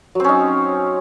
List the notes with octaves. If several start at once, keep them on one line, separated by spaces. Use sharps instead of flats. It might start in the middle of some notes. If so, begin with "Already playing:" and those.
F#3 C4 C#4 D#4